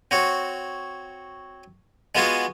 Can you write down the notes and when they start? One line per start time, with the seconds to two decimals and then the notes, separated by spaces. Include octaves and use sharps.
0.11 C4 F#4 C#5
2.15 G#3 B3 F4 F#4 G#4